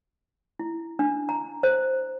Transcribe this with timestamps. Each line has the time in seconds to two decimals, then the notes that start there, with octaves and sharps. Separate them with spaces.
0.59 E4
0.99 D4
1.29 A#5
1.63 C5